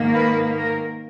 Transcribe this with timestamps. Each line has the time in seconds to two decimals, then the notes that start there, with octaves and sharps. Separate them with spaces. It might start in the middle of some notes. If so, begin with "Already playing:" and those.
Already playing: G#2 D#3 A#3
0.15 B4
0.56 A#4